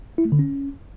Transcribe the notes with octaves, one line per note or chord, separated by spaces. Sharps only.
E4
A3
D3
C#4